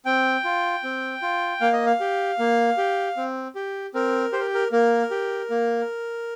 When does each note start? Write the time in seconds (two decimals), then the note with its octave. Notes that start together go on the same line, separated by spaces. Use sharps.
0.06 C4 G5
0.44 F4
0.84 C4
1.22 F4
1.60 A#3 F5
1.73 D#5
1.86 F5
2.00 G4
2.39 A#3
2.77 G4
3.17 C4
3.55 G4
3.94 C4 A#4
4.32 G4 C5
4.40 A#4
4.54 A#4
4.72 A#3 A#4
5.11 G4
5.50 A#3